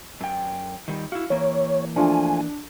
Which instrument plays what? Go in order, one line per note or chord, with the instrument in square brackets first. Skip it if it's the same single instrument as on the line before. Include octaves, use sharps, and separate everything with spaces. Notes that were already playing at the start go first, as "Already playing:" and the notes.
[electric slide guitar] F#2 G5
D#3 G3
[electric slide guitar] E4 F#4 [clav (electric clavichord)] F5
[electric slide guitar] E3 A#3 [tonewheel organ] C#5
[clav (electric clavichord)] F3 A3 F4 [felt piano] D4 [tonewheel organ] G#5